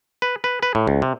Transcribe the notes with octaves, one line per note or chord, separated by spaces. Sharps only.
B4
B4
B4
A2
C#2
C3